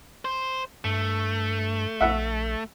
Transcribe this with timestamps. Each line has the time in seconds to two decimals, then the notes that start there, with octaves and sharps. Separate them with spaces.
0.25 C5
0.84 G2 A3
2.01 A#1 E5 F#5